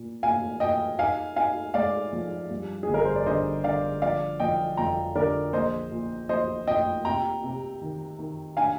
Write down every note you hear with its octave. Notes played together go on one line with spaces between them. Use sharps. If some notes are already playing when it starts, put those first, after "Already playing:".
Already playing: A#2
A#2 F5 G#5
A#2 D#5 G5
D#4 F5 G#5
D#4 F5 G#5
G#3 D5 F5
F3
G2
G#4
G1
A#4
C5
D5
D3 C5 D#5
D3 D5 F5
F3 D5 F5
F3 D#5 G5
F2 G5 A#5
D3 A#4 D5
A#1 C5 D#5
A#2
A#1 C5 D#5
A#2 D#5 G5
C3 G5 A#5
C3
D#3
D#3
D4 F5 G#5